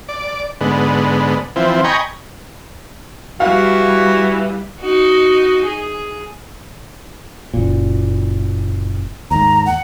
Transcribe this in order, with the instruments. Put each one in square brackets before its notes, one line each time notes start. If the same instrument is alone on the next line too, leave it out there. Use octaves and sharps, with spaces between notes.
[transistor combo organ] D5
G#2 D3 B3
E3 F3 C4
D#5 G5 G#5 A#5 B5 C#6
[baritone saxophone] E3 [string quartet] G3 [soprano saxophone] F#4 [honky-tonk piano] F5
[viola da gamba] D#4 F#4
G#4
[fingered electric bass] F#1 A#2
[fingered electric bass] D#2 G#2 [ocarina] A#5
[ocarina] F#5